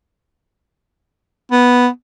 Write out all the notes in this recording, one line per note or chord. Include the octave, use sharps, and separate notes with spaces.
B3